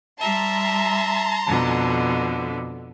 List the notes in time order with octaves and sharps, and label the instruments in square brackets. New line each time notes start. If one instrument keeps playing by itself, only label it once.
[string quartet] G3 E5 [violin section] A5 A#5 C6
[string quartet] F2 B2 D3